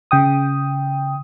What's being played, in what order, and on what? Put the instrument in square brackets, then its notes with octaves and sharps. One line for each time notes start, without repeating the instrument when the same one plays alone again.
[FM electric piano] C#3 G5 D#6